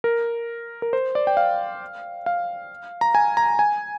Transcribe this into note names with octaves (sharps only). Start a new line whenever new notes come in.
A#4
A#4
C5
D5
G5
F5
F5
A#5
G#5
A#5
G#5